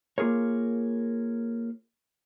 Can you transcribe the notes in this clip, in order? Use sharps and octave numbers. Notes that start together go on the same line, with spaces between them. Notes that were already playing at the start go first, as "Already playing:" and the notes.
A#3 F4 G#4 A#4 C#5